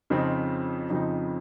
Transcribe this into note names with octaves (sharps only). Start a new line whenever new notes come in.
F2 C#3 F3 C4 D#4
F2 C#3 F3 C4 D#4